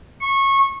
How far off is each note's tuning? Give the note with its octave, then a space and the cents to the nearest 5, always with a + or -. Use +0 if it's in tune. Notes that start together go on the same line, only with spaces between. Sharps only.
C#6 -20